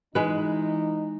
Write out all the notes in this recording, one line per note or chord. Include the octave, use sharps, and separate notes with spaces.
E3 G#3 D#4 B4